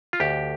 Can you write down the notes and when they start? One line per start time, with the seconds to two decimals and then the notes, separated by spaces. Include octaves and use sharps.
0.13 F4
0.20 D2 G4